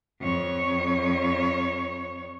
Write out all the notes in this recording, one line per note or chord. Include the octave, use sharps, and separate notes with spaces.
F2 C#5